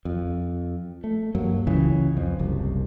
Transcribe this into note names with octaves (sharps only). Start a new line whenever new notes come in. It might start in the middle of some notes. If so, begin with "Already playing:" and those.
F2
A3
G2 F#3 A#3
C#2 C#3 E3
F2
F#1 C2